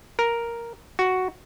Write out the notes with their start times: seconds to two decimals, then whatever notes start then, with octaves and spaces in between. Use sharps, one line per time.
0.19 A#4
0.99 F#4